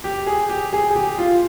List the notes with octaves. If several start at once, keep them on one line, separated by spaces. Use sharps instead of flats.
G4
G#4
G4
G#4
G#4
G4
F4